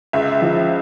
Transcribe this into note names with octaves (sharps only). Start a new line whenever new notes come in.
C#2 E5
F3